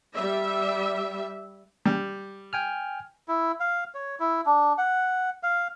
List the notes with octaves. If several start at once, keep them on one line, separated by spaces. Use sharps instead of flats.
G3 E5
G3
G5 G#5 F6
E4
F5
C#5
E4
D4
F#5
F5